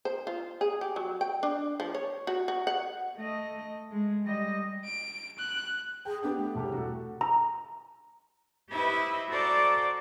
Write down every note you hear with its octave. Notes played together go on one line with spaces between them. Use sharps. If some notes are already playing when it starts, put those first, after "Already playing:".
C5
F4
G#4
G4
F#3
G5
D4
F3
C#5
F#4
F#4
F#5
A3 D#5
G#3
G3 D#5
D7
F#6
G#4 G5
B3 D4 G4 G5
A3
E1 C2 G4
F#4 A4
A#5
E4 G4 B4 C5 D#5 E5
F#4 A4 C5 D5 A5 A#5